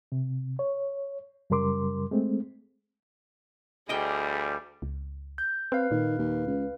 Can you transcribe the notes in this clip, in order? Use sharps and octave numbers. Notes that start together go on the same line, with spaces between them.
C3
C#5
F#2 C#3 G3 A#4 C6 D6
G#3 A3 C4
D2 G3 G#4 D#5 G5
C#2
G6
C4 B4 F5
A#2 D#3
D#2
C#2